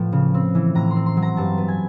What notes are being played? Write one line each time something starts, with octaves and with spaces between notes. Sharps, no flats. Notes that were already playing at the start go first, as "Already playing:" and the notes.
Already playing: A2 F3 B3
C#3
C4
E3
A2 A#5
C6
C4
C6
F#3
A#5
G2 A5
B3
G#5